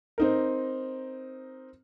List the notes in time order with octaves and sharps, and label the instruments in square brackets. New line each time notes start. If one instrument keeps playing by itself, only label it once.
[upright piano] C4 D#4 A#4